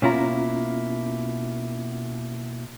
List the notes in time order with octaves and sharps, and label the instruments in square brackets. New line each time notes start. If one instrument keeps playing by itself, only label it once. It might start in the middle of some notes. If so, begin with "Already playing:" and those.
[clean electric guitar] B2 A#3 E4 [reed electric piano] C#4 F4 A#5